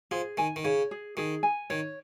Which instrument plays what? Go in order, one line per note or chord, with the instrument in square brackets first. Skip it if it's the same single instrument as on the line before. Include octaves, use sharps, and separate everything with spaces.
[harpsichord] F3 [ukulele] G#4
[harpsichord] D#3 [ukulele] G#5
[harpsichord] D#3
[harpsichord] C#3 [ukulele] C#5
[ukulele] G#4
[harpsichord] D#3 [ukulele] G#4
[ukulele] G#5
[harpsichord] D#3 [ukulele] C#5